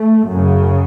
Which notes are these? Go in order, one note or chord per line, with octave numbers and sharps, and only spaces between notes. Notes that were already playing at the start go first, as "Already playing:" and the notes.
Already playing: A3
F#2 C#3